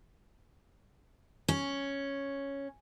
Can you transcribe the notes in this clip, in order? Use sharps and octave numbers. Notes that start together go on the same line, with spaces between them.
C#4